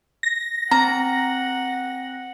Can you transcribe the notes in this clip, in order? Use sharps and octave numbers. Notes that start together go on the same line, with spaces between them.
A#6
C4 F#5 A#5